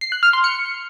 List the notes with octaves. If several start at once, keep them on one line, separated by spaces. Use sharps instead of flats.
C7
F#6
F6
C6
C#7